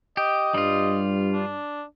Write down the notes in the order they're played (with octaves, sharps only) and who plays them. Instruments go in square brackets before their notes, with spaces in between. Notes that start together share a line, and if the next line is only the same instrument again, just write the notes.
[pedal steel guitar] G4 [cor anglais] D#5
[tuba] G2 [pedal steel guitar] G3 F4
[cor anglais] D4